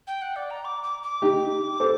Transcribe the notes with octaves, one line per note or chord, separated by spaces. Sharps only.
G5
F#5
D5
A#5
D6
D6
D6
D#4 G4
A4 C5